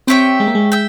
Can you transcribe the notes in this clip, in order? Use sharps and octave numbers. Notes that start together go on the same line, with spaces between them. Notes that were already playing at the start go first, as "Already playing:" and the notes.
C4 G4 C#5 E5 G5
G#3
A#3
G#3
E5 G5